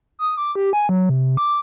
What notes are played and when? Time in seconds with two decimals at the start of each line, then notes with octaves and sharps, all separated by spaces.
0.19 D#6
0.37 D6
0.55 G4
0.73 G#5
0.89 F#3
1.09 C3
1.37 D6